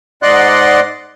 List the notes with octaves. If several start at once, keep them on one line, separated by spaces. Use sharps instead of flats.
G#2 D5 D#5 F#5 C6 F#6